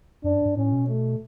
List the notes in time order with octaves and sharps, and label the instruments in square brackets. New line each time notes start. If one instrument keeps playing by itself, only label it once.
[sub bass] F#2 [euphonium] D4
[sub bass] G2
G2
[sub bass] A2 [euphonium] C#4
[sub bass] B2
[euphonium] A3